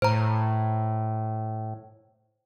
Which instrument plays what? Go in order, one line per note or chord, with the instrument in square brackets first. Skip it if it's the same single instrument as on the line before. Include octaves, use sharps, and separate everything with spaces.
[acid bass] A2 [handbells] C5 A#5